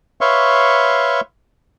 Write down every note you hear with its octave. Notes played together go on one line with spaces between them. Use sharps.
B4 C#5 E5 F5 C6 C#6